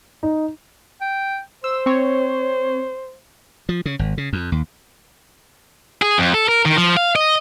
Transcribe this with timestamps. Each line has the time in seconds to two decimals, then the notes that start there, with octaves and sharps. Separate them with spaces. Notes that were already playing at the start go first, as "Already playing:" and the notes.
0.23 D#4
1.01 G5
1.64 C5 E6
1.86 C4 C#5
3.69 F3
3.86 C#3
3.99 G#1
4.18 C#3
4.33 F2
4.52 D#2
6.02 G#4
6.18 F2
6.34 A4
6.48 A#4
6.65 D#3
6.77 F3
6.97 F5
7.16 D#5